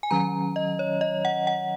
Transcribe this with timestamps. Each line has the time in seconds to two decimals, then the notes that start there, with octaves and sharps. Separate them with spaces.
0.03 G#5
0.11 D#3 F#3 C#4 A#5
0.56 D#5
0.79 C#5
1.01 D#5
1.25 F#5
1.47 F#5